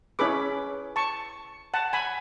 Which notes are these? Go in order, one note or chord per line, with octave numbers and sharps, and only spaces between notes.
C#4 E4 G#4 B4 B5 D6
A5 C#6
F#5 A5
G#5 B5